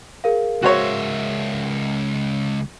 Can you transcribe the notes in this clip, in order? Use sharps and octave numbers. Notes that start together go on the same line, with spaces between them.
G#4 A#4 F5
C#2 F#4 C5 C#5 E5